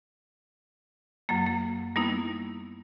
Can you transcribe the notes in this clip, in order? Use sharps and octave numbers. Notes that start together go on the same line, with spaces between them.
F#2 F#3 A#3
A#3
G3 A#3 B3 D#4 E4